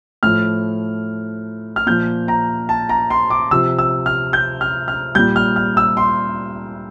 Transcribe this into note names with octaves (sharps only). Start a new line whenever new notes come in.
A2 F3 F6
F6
A#2 F3 G6
A#5
A5
A#5
C6
D6
C3 F3 E6
E6
F6
G6
F6
F6
A#2 G3 G6
F6
F6
E6
C6